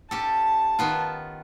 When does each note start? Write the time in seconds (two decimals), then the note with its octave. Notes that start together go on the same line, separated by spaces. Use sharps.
0.11 C#4 G4 A4 A5
0.79 D#3 B3 F4